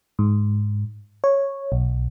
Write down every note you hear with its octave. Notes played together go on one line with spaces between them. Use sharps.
G#2
C#5
B1